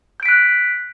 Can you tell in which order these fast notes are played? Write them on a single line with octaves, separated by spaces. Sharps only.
G6 D7 B6 F#6